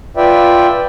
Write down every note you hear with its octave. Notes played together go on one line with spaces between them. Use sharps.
F4 B4 D5 E5 G5